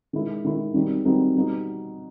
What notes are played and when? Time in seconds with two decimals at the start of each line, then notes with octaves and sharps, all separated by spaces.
0.13 D#3 G#3 C#4 E4
0.45 D#3 G#3 C#4 E4
0.74 D#3 G3 C4 D#4 F#4
1.05 D#3 G3 C4 D#4 F#4
1.35 G3 B3 D#4 F#4